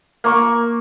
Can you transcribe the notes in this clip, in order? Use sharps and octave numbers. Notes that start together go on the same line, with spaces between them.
A#3 C#6